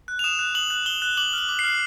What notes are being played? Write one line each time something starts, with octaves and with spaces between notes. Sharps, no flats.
F#6
F7
D#6 E7
F#6
D#6 F#7
F#6
D#6 G7
F#6
D6 F#7
F6 F#7
D6
C7
F6